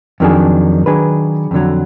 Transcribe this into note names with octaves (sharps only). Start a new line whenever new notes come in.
F2 D#3 F#3 D4 G#4
D#3 F#3 D4 G#4 B4
F2 D3 F#3